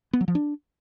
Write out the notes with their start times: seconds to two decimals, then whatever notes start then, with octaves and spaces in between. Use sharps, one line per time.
0.13 B3
0.21 F#3
0.28 F3
0.35 D4